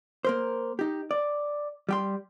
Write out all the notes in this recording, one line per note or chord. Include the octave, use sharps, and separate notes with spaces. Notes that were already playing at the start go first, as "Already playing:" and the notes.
A#3 A#4 C5
D#4 G4
D5
G3 G5 C6